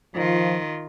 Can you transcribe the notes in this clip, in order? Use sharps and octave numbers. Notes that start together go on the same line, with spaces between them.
D#3 F3 F4